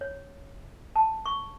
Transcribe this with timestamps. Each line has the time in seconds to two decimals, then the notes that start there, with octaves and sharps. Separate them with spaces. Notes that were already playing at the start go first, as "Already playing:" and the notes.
0.01 C#5
0.96 A5
1.26 C#6